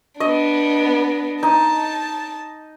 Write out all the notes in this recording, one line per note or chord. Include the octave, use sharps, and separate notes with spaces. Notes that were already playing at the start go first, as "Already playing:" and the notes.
B3 D4 D#5
D#4 A5